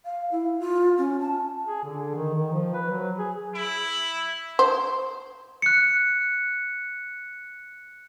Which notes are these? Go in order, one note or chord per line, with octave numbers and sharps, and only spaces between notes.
F5
E4
F4
C#4
A5
G#4
D3
D#3
D#3
F3
B4
F#3
G#4
E4
C5
F#6 C#7